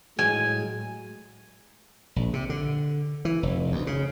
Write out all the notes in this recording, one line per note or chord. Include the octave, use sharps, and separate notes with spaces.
A2 F#3 G#3 G#5
A#1
C3
D3
E3
F1
D2
C#3